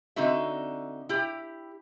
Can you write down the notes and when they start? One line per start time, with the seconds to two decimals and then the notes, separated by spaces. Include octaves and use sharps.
0.16 D3 C4 D#4 F#4 E5
1.09 E4 G4